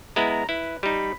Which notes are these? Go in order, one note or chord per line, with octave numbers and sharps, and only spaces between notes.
G#3 B3 E4 A#5
A#5
E4 B4
G3 D#4 B5